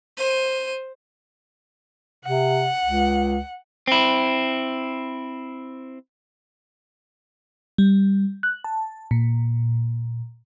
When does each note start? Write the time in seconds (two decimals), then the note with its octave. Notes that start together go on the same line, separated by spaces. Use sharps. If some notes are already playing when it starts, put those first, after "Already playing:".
0.17 C5 D#7
2.25 C3 F#5
2.84 C#2
3.88 C4 E4
7.78 G3
8.43 F#6
8.64 A5
9.11 A#2